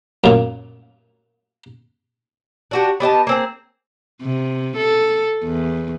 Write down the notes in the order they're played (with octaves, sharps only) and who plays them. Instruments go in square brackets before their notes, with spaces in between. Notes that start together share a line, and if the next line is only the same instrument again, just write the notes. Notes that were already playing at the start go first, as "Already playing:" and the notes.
[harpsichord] F#2 A#2
[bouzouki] D4 F#4 G4
B3 G4 D#5 A5
A#3 C4 G#4
[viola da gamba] C3
A4
E2